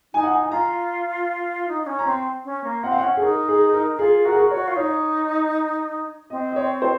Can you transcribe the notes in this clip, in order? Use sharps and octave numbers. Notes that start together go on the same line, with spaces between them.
D#4 G#5
F#5
G#5
G#5
F4 A#5
D#4
D#4
C#4
A#5
C4 C6
C#4
A#3
C4 F#5
F5
C#4 F#5
G#4
D#4 A#4
G#4
A#4
D#4
F4 G#4
F#4 A#4
G#4
A#4
F#4 C#5
F4
D#4 C#5
C4 D#5
D#5
C#5
C5